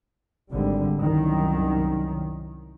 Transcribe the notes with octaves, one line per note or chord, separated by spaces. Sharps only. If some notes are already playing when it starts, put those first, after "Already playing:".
G#1 D3 G3
C2 F#2 D#3